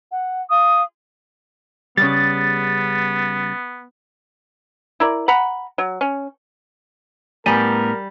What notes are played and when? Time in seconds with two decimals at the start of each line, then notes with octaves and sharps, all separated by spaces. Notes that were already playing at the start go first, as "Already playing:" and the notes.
0.12 F#5
0.50 F5 D#6
1.97 C#3 G3 B3 A6
5.00 E4 A#4 D5
5.28 F#5 A#5 B5
5.78 F#3
6.01 C#4
7.46 A2 G3 B3 A#4 G#5 A#5